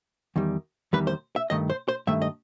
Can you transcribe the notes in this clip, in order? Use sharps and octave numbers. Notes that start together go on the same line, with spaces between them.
E2 D#3 G3
E2 D#3 G3 B4
C5
E5
G2 D#3 A3 D#5
C5
C5
G2 D#3 A3 E5
D#5